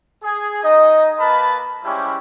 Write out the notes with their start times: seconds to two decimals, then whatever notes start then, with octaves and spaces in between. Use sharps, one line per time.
0.24 G#4
0.63 D#4 D#5
1.19 A#3 A#4 B4 A5 B5
1.84 G3 G#3 C#4 E4 G4 C5